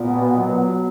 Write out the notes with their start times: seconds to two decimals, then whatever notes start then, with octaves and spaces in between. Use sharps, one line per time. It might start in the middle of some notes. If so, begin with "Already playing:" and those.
Already playing: A#2 B3
0.14 B2
0.37 F#3
0.60 F#3